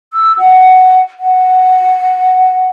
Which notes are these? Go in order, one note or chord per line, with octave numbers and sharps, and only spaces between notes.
E6
F#5
F#5